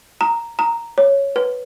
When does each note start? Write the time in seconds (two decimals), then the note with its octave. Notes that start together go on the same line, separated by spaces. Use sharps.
0.21 A#5
0.59 A#5
0.98 C#5
1.36 B4